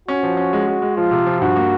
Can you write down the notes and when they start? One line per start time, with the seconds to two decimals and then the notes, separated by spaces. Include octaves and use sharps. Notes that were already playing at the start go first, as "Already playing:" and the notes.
0.08 C#4 F#4
0.23 F3
0.37 C#4
0.53 G#3
0.67 G#3
0.82 G#3
0.96 F3 F4
1.11 C3
1.26 F3
1.41 G2 F#4
1.56 A#3